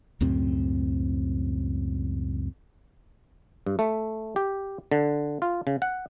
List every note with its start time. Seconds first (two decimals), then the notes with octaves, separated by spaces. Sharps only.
0.21 C#2 F#2 A2 C4
3.67 G2
3.79 A3
4.36 G4
4.92 D3
5.42 F4
5.67 C#3
5.82 F#5